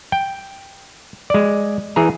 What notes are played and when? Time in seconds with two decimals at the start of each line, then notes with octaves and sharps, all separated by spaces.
0.12 G5
1.30 G#3 D5
1.96 E3 G#4 A#5